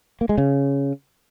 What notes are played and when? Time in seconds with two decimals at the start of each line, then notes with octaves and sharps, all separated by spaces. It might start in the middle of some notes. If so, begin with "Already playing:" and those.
0.21 A#3
0.29 G#3
0.38 C#3